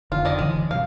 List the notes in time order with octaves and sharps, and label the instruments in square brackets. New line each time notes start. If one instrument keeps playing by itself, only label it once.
[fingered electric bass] F1 D3 [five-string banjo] F4
[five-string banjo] D#3 D5 D#5
[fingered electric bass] D1 D3 E3 [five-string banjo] G#3
[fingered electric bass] G2 C3 [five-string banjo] F5